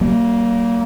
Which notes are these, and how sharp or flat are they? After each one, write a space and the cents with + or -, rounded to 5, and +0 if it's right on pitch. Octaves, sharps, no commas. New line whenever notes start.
G3 -45 A#3 +0